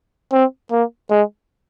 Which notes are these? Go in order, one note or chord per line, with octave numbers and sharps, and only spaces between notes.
C4
A#3
G#3